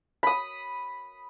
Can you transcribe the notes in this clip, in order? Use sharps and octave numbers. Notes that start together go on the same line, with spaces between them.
B5 D#6